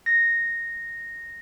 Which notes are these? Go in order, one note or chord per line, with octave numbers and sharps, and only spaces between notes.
A#6